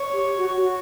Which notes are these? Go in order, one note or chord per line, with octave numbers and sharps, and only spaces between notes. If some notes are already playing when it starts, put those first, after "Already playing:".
Already playing: C#5
G4
F#4
F#4